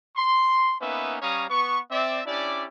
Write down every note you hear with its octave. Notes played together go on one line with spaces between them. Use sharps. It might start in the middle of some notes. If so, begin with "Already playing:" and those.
C6
A#3 B3 C#4 D#4 B4 E5
G3 C#4 C#5 F5 A#5 D#6
B3 C#6
C4 D5 E5
C#4 D4 E4 G4 D5